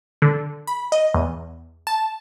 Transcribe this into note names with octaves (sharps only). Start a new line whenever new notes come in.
D3
B5
D#5
E2
A5